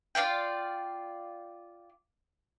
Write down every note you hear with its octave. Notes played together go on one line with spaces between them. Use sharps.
F4 D5 F5 G5